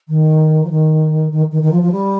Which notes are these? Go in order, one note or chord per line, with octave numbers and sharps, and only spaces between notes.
D#3
F3
D#3
D#3
D#3
D#3
F3
F3
G3